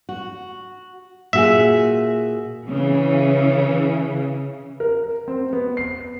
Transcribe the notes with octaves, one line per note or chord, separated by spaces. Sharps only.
F#4
A#2 F#4 G#4 E5
C#3 E3
A#4
C4
B3
C7